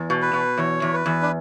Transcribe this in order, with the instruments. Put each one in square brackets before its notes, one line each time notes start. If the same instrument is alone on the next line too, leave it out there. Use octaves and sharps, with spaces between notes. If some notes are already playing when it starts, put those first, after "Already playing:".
Already playing: [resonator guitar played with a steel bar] E2
B2
[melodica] B4
[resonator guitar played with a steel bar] B2
[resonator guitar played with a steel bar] E2 [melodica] C#5
[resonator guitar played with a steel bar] E2
[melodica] B4
[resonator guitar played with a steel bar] E2
[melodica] D4